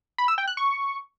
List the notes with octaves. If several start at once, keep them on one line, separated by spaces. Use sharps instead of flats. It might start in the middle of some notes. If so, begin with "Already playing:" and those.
B5
E6
G5
F#6
C#6